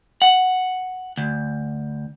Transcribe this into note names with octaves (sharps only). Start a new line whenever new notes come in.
F#5
D2